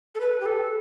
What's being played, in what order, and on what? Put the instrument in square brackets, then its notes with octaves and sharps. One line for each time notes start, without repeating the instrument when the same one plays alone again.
[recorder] A4
B4
G4
A4